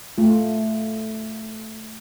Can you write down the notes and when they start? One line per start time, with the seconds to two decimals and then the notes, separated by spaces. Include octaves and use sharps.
0.18 A3 F4